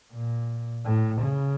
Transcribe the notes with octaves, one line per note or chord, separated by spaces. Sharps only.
A#2
A2
C#3